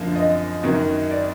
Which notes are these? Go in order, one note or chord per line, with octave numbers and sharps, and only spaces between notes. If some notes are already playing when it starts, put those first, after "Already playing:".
Already playing: F#2 D3 F3 A#3
D#5
F#2 D#3 F#3
D5